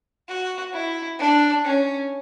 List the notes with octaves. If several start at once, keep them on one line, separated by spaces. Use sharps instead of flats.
F#4
E4
D4
C#4